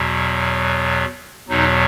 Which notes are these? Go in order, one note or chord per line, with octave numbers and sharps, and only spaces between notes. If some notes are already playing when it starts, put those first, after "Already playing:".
Already playing: E2 B2 F#3
E2 B2 F#3 D#4